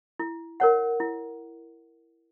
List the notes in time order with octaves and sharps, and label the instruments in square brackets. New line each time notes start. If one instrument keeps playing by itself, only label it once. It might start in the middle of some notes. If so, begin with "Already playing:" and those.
[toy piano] E4
A#4 C#5 F#5
E4